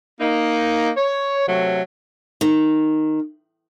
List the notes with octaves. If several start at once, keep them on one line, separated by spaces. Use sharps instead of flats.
A#3 D#4
C#5
C3 F#3 A3
D#3